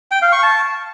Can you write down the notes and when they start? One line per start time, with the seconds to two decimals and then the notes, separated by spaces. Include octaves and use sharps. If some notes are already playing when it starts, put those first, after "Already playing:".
0.11 G5
0.22 F5
0.32 C#6
0.43 A5